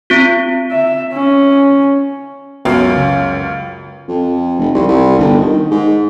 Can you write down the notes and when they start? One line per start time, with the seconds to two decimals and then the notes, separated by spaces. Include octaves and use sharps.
0.10 C4 F4
0.72 E5
1.13 C#4
2.65 C#2 F#2 B3 F4 F5
2.96 C#3
4.08 F2
4.59 F1
4.74 C2
4.88 C2
5.18 G1
5.37 D#3
5.71 G#2